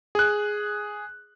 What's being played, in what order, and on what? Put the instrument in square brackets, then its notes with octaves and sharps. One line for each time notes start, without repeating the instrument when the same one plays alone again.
[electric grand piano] G#4 F#6